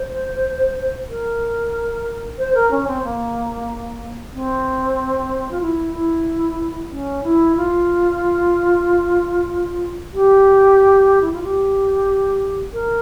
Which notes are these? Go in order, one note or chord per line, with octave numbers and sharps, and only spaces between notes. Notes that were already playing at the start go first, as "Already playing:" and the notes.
Already playing: C5
A#4
C5
A#4
C#4
C4
A#3
C4
F4
E4
E4
C#4
E4
F4
G4
E4
F4
G4
A#4